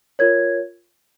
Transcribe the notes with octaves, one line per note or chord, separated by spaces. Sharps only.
F4 A#4 C#5 G#6